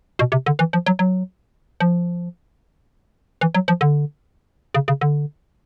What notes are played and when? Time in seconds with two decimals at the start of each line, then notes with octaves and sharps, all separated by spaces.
0.19 B2
0.32 C3
0.46 D3
0.59 E3
0.73 F3
0.86 F#3
0.99 F#3
1.80 F3
3.41 E3
3.55 F#3
3.68 F3
3.81 D3
4.74 C#3
4.88 C#3
5.01 D3